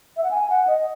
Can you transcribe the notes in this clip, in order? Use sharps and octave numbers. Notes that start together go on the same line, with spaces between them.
E5
F#5
G#5
F#5
D#5